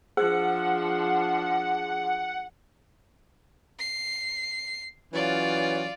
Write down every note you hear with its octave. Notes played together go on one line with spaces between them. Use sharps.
F3 D4 G#4 F#5
C7
E3 F#3 C#4 F4 D5